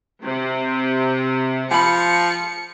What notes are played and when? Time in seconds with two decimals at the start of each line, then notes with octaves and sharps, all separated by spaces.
0.24 C3
1.71 F3 G5 B5 C#7